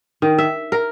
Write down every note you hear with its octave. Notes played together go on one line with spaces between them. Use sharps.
D#3
E5
A#4